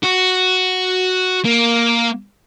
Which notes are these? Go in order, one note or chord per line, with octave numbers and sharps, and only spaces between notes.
F#4
A#3